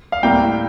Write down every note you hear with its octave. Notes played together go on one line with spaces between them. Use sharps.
F5
A2 G3 A#3 E4 G5